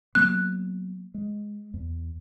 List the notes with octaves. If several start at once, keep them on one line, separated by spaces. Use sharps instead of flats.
F#3 A#3 B3 F#6
G#3
E2